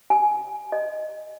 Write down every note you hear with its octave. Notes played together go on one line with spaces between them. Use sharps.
G#5
D#5